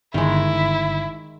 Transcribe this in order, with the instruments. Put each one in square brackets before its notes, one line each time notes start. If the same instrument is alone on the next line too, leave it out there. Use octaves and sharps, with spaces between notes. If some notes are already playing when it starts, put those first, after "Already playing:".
[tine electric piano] G1 [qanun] D#3 G#3 [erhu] E4